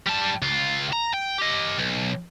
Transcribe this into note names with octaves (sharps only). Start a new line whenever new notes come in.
G3 A5
C#2 F4
A#5
G5
G4 D#5
B1